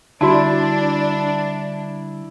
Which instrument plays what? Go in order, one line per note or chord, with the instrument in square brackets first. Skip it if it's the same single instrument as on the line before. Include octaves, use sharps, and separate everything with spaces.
[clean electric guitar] D3 G3 [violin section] D4 [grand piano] E4 [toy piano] F#4 A5